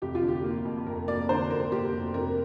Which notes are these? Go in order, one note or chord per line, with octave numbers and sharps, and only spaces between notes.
F1 G4
F4
D3
G4
A#3
F2
F1 A#4
A#3 D5
D3 C5
F1 A#4
A#3 G4
F1
F1 A#4